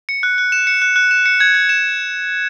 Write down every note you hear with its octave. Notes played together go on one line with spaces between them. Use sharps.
C#7
F#6
F#6
E7
C#7
F#6
F#6
E7
C#7
G#6
G#6
E7